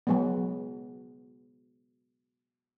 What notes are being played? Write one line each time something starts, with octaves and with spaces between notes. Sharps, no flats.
F#3 G#3 B3